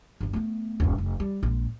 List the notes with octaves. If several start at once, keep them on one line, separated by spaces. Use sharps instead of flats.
G1 D#2
A3 B3
D#1 G2
F1
G3
A#1 G#3